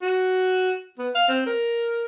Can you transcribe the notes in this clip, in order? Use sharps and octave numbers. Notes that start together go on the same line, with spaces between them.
F#4
B3
F5
C4
A#4